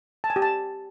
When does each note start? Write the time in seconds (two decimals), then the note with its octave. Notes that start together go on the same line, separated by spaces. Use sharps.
0.24 A5
0.30 G#5
0.36 G4
0.42 A5